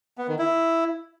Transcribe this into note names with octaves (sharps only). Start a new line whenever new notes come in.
B3
D#3
E4